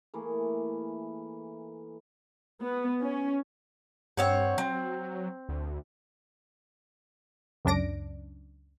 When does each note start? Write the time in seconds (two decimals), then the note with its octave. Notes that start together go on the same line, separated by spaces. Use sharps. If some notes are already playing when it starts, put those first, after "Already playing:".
0.14 E3 A3 A#3 G#4
2.62 B3
3.02 C#4
4.17 G2 C4 C#5 F#5
4.58 F#3 C4
5.49 D2
7.65 C#2 F#2 C#3 D4 A#6 D7